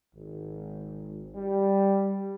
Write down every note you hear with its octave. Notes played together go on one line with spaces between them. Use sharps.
G#1
G3